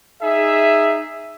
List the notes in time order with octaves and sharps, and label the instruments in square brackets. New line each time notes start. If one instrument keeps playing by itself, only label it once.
[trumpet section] D#4 G#4 E5